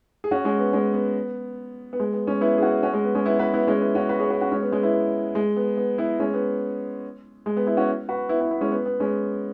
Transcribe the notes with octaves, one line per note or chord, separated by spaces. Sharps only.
G#4
C#4 F#4
G#3 C#4
B3
G#3 C#4
B3
B3
G#3
B3
G#3 C#4
B3 E4
G#4
C#4 F#4
C#4 F#4
G#3
B3
G#3 C#4
B3 E4
F#4 B4
B3 E4
G#3 C#4
B3 E4
C#4 F#4
F#4 B4
G#4 C#5
F#4 B4
C#4 F#4
G#3 C#4
B3
G#3 C#4
B3 E4
B3
G#3
B3
B3
B3 E4
G#3 C#4
B3
G#3
B3
B3 E4
C#4 F#4
F#4 B4
B3 E4
B3 E4
B3 E4
G#3 C#4
B3
B3
G#3 C#4